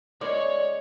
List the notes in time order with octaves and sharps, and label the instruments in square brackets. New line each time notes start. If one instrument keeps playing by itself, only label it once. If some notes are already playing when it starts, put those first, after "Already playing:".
[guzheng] G#3 C#4 [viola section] C#5 [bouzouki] D5